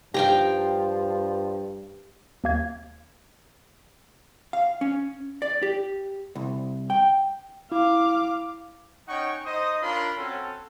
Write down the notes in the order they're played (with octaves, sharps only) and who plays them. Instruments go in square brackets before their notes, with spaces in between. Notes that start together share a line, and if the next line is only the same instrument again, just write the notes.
[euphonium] G2 [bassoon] F3 [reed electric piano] G4 [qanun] F5 G5 A#5
[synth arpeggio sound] D#2 A#3 G#6
[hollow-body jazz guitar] F5
C#4
D5
G4
C2
G5
[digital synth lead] E4 [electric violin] F5 D6
[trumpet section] C#4 D#4 C#5 F#5 G5 C#6
D#4 C5 D#5 D#6
D4 F4 A#4 C#5 B5 C6
C4 C#4 F#4 A4